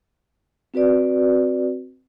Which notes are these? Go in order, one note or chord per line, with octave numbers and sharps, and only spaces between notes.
C4 F#4 B4 D5